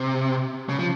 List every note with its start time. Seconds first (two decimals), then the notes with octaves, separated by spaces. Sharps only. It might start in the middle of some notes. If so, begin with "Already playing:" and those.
Already playing: C3
0.69 C#3
0.79 F3